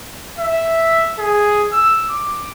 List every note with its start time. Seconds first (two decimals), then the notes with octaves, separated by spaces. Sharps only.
0.39 E5
1.19 G#4
1.72 E6
2.10 D6